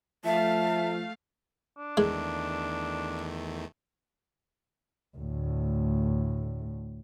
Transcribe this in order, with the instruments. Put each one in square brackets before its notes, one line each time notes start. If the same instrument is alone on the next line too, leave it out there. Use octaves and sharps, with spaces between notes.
[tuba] F3 [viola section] A3 F5 [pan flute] E5 [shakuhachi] A5
[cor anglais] D4
[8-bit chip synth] E2 D#3 A3 [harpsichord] G#3
[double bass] D2 A2